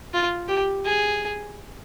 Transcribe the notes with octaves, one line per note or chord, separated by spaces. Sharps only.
F4
G4
G#4